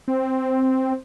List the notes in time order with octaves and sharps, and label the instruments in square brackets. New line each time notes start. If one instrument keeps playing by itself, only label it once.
[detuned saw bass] C4